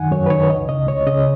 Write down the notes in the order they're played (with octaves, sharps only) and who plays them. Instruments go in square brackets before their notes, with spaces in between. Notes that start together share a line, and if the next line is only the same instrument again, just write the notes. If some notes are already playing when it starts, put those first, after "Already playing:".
Already playing: [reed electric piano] F#2 D#3 F#5 G#5
F#2 C#5
B4
D#3 C#5
C#2 D#5
C#3 D#5
C#2 C#5
C#3 D#5